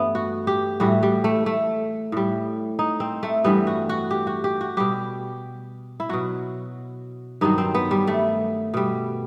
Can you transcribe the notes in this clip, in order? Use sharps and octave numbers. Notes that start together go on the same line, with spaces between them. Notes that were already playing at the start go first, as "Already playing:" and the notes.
Already playing: G2 E3 A3 B3
F#4
G4
A2 E3 G3 F#4
G3
A3
A3
A2 G3
D#4
C4
A3
G2 E3 G3 B3
F#4
F#4
G4
F#4
G4
F#4
B2 G3 G4
E4
B2 F#3 F#4
G2 D#3 F#3 D#4
C4
B3
G3
A3
B2 G3